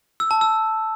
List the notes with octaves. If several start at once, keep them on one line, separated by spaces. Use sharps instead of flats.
E6
A5
E6